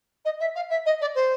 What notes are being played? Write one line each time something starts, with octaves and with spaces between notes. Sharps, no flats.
D#5
E5
F5
E5
D#5
D5
C5